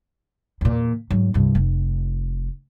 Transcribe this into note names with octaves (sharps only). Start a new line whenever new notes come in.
E2 A#2
G#2 F#3
C2 G2
F1